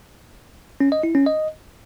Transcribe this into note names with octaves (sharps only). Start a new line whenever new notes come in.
C#4
D#5
E4
C#4
D#5